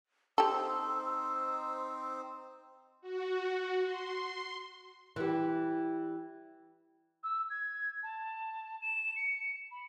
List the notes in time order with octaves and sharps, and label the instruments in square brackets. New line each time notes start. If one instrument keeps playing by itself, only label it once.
[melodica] C4 D#4 C5 [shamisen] G4 A4 [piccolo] E6
[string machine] F#4
C6
[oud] E3 G3
[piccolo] E6
G#6
A5
E7
C#7
B5